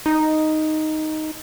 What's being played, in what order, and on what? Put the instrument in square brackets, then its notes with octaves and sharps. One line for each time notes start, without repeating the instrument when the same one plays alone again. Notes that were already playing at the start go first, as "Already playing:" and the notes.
[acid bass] D#4